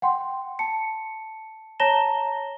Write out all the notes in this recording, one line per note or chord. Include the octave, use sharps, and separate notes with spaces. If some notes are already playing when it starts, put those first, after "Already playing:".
F#5 G5 C6
A5 C#7
C#5 A5 A#5 A#6 E7 G7